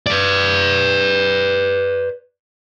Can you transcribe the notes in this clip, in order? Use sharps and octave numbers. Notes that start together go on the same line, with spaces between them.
B4 D5